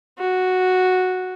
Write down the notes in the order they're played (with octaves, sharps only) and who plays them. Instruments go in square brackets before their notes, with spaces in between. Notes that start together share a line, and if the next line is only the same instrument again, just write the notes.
[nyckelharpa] F#4